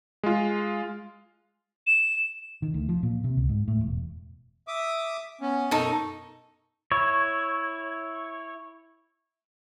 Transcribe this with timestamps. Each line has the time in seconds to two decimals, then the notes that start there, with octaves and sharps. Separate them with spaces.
0.23 G#3 F4
1.87 E7
2.62 D#3
2.74 D2
2.89 F3
3.03 A#2
3.24 C3
3.37 C#2
3.49 G#2
3.68 A2
3.81 E1
4.68 E5 D6 D#6
5.41 B3 C#4
5.71 F#2 B2 D#4 A4 C#6
6.92 E4 C#5